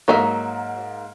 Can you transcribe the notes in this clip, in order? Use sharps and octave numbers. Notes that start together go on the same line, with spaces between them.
G#2 F#3 A#3 D#4 E5